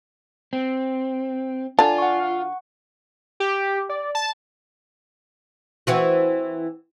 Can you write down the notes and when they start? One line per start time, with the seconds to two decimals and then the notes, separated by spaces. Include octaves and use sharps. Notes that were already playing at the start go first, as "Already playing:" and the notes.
0.53 C4
1.79 D3 F4 D5 G#5 A5
1.98 F#5 C#6
3.40 G4
3.89 D5
4.15 A5
5.87 E3 C4 F#4